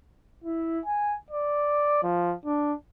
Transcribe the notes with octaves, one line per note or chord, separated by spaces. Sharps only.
E4
G#5
D5
F3
D4